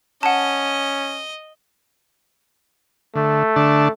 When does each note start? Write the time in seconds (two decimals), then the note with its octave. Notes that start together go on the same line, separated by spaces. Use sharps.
0.23 C#4 D#5 F#5 A5
3.15 D3 A3
3.56 D3 D4 A5